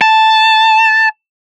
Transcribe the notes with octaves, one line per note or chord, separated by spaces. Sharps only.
A5